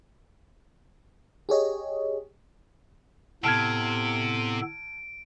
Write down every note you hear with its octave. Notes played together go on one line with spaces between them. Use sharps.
G4 G#4 C#5 D#5
A2 C3 B3 A4 A5 F6 G#6 D7